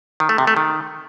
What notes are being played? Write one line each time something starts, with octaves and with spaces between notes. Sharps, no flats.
D#3
A3
C3
A3
D#3